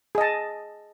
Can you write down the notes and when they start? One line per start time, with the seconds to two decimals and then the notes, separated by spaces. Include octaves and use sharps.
0.15 G#4
0.18 D#5
0.21 A5